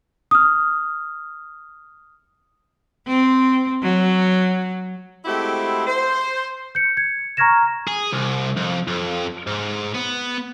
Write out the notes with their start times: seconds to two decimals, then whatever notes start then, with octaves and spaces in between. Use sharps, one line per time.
0.31 D#6 F6
3.07 C4
3.82 F#3
5.25 G#3 A3 C4 E4 F#4 G4
5.87 C5
6.75 G6 C#7
6.97 G#6 C#7
7.37 A#5 C#6 F6 G#6 A#6 E7
7.88 G#4
8.12 C2
8.56 F2
8.87 F2
9.47 G#2
9.94 B3